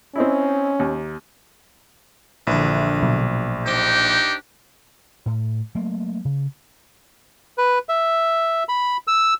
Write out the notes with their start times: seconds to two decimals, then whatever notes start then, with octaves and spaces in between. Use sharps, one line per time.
0.16 C4 C#4 D#4 E4
0.79 D#2
2.47 A#1 D3 E3
3.02 B2 F#3
3.66 D4 D#4 G4 C5
5.26 A2
5.75 F#3 A3 A#3
6.25 C#3
7.58 B4
7.89 E5
8.69 B5
9.07 E6